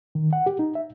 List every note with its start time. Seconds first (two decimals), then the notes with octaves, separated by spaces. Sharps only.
0.15 D#3
0.33 F#5
0.46 G4
0.59 D#4
0.75 E5